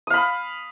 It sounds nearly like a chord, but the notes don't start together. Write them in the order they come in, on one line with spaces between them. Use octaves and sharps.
D#6 F5 B5